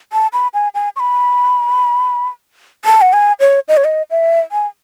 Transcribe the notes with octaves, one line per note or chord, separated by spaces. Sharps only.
A5
B5
G#5
G#5
C#6
B5
A5
F#5
G#5
C#5
D#5
C#5
D#5
E5
G#5